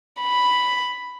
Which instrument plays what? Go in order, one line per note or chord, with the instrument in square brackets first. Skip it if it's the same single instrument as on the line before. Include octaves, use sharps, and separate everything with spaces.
[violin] B5